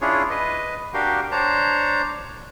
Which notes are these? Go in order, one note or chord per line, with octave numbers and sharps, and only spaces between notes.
C#4 D4 E4 F4 G#4 C#5
B4 D#5
D4 F#4 G4 A#4 F5 G5
D4 C5 C#5 A5 A#5